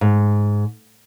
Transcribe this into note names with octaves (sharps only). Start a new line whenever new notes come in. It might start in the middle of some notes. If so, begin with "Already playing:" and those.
G#2